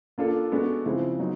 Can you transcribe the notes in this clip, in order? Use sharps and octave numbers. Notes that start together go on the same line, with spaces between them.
A#3 D4 F4 A4
G#3 B3 D4 F#4 A4
C#3 F3 G#3 C4 E4
F#3 B3 D#4